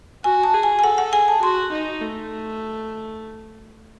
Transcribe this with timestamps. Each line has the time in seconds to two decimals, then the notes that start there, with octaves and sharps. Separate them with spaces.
0.24 F#4 G#5
0.43 A5
0.54 G#4
0.63 G#5
0.79 G#5
0.83 A4 F#5
0.98 F#5
1.13 G#4 G#5
1.28 A5
1.42 F#4 C6
1.72 D#4
2.01 A3